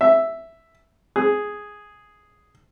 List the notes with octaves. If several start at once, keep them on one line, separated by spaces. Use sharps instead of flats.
E5
G#4